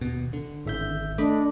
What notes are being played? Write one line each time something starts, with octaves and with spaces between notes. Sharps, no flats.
D#2 B2
D3
G#1 E5 G6
A3 D4 D#5 B5 D6